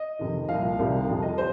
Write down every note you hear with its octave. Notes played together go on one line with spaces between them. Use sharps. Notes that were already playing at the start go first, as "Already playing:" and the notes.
Already playing: D#5
F2 C3 D#3
C2 A#2 F3 F5
C2 C3 D#3 G3
F2 C3 F3
D#5
G3 C5